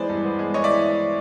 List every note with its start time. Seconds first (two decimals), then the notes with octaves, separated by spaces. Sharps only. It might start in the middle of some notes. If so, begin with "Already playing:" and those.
Already playing: E3 G#3 B3 C5 D5
0.09 G2
0.25 B3
0.39 G#3
0.54 E3 C#5 D#5
0.64 D5 E5